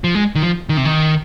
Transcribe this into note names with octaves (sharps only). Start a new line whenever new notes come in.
F3
G#3
D#3
F3
D#3
C3
D#3